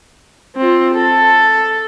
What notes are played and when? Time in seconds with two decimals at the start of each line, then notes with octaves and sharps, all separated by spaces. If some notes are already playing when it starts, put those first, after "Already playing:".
0.56 C4 F4
0.94 A4